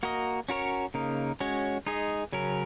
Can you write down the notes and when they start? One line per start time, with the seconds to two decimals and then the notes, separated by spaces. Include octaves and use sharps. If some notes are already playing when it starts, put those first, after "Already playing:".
0.03 A#3 F#4 A#4 D#5
0.49 C#4 F#4 A#4 C#5
0.94 C#3 A#3 D#4 A#4
1.40 G#3 C#4 F#4 C#5
1.86 G#3 D#4 G#4 D#5
2.33 C#3 F#3 C#4 A#4